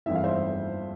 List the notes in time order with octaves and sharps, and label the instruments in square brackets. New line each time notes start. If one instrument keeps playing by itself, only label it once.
[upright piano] G1 F2 E3 E5
F5
C5 E5